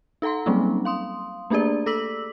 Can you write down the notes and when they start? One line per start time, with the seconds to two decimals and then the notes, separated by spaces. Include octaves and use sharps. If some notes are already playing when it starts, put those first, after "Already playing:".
0.22 D#4 A4 F#5 A#5 C6
0.46 F#3 G3 A#3 C4 C#4 D#4
0.85 F5 C6 D#6
1.50 A3 A#3 D4 G4 G#4 D5
1.86 A4 D6 E6 B6 F#7